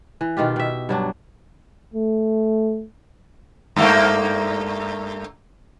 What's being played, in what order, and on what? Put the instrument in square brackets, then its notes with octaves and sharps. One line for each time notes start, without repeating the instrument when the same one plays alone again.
[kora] E3
B2 D#3 F4 G4
B2 E5
G2 F#3 D4
[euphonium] A3
[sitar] G2 A3 A#3